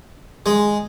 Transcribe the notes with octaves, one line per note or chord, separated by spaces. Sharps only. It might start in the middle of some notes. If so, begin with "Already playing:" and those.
G#3